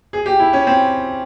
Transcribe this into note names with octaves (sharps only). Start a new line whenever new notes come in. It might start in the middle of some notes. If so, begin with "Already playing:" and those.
G#4
G4
E4
C#4
C4